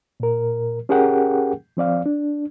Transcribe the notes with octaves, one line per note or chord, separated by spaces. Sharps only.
A#2 A#4
C#4 G4 G#4 A#4 F#5 G5
F3 C4 D5 F5
D4